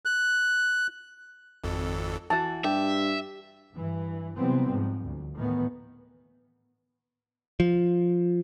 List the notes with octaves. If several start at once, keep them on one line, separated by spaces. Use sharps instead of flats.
F#6
G#1 F2 A4
E3 F#4 A5
G2 G4 E5
G2 E3
C3 E3 F#3 G3 B3 C4
G#2 F3
D2
A2 D#3 E3 B3
F3